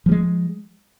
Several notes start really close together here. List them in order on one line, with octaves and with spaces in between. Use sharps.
F3 G3 G#3